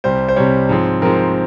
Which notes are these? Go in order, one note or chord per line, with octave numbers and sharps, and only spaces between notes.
C2 C3 G3 C5
C5
C2 C3 G3 C#5
G#2 F3 C4
G#2 F3 C4 A#4